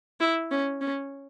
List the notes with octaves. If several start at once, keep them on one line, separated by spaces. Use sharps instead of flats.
E4
C#4
C#4